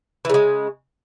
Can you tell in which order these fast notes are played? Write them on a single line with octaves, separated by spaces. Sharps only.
E3 C#3 G#3